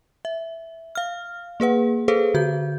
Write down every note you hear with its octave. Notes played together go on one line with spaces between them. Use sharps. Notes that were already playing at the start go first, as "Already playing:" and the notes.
E5
F5 F6
A#3 G#4 B4 F#5
G#4 A4 B4 C5 F5
D3 F#4 G6